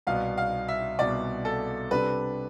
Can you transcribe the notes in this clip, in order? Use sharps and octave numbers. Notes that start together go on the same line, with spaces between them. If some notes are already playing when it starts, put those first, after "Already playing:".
C2 B2 B3 F5
F5
E5
C2 B2 B3 D5
A4
C3 G3 D4 A4 B4